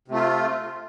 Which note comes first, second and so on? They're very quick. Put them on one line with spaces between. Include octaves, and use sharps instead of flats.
C3 A3 F4